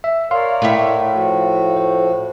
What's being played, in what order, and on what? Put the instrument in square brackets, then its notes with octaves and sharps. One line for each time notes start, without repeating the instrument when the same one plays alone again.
[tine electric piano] E5
[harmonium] A#4 C#5 D5 [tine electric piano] F5 C6
[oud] A2 E5
[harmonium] F3 F#4
[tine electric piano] C5